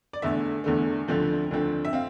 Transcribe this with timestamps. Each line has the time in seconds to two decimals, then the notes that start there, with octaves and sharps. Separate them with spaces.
0.13 D5
0.22 E2 D3 A3 E5
0.64 E2 D3 A3
1.08 D2 D3 F3 A3 C4
1.51 D2 D3 F3 A3 C4
1.85 E5
1.93 C4 F5